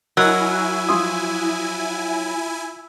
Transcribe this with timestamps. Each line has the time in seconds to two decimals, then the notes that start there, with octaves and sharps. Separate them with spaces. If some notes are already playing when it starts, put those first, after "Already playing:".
0.17 F#3 E4 A#4 D#5 G#5 E6
0.89 F3 C6 D#6